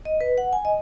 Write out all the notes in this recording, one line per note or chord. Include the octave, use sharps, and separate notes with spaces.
D#5
B4
F#5
G#5
D#5